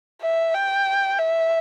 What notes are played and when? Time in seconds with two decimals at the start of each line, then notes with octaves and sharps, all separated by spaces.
0.22 E5
0.54 G5
1.19 E5